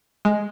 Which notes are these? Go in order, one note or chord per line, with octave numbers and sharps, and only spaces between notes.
G#3